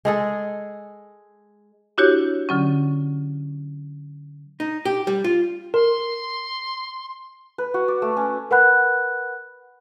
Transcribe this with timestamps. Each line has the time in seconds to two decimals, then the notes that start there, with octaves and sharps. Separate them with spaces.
0.05 G#3 G#4 A4
1.98 D4 E4 F#4 G4 C#5
2.49 D3 F#3 C#4
4.60 D#4
4.85 G4
5.07 G3
5.24 F4
5.74 A#4 C6
7.58 B4
7.74 F#4
7.88 D5
8.02 A3
8.17 C#4
8.51 A#4 B4 F#5 B5 F#6